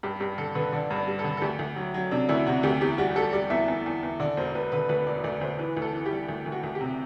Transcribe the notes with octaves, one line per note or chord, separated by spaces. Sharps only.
G2 G4
G2 G4
D3 A4
D3 B4
D3 D5
G2
D5
G3
A4
D3
A4
D2 G4
D2
F#3
F#3
C3 D4
D2 E4
C3 F#4
D2 G4
E2 G4
G3 F#4
G3 A4
G3 D5
E2 E5
E2
E2
E2
D3 D5
E1 C5
E1 B4
D3 B4
D2 B4
E1 D5
D2 D5
D2 C5
E3 B4
D2
A4
E3
G3 G4
D2
D2
F#4
D2
G4
C3